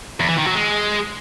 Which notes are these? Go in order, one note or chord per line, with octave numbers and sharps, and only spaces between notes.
E2
E3
D#3
F#3
G#3